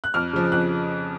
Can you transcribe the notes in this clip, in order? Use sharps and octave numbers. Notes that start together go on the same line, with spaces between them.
F#6
F2 F6
C#3 F3
F2 F#6